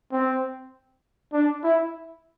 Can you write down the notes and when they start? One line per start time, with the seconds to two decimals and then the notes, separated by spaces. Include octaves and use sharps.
0.12 C4
1.33 D4
1.63 E4